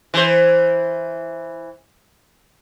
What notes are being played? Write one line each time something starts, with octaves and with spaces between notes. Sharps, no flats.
E3 C5